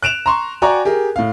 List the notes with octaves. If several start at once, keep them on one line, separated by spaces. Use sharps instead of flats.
F#6 D7 E7 F7
A#5 C6 C#6
F#4 D5 G5 G#5 A#5 C#6
G4 G#4 A#4
A2 F5